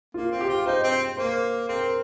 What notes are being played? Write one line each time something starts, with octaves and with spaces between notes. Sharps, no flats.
A#3 F4
C4
G4
F4
D#4 C5
C4
A#3 C5
C4 A#4